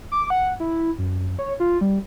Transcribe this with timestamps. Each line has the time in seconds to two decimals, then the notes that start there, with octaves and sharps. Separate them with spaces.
0.12 D6
0.30 F#5
0.60 E4
0.98 F#2
1.39 C#5
1.60 F4
1.81 G3